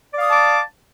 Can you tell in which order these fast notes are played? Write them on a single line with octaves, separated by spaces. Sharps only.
D5 F5 D#6 A5 D6